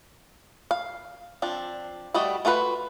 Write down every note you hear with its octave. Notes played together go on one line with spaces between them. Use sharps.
F5
F3 C4 D4
G3 A3 F#4 D5 D#5
A3 F4 F#4 B4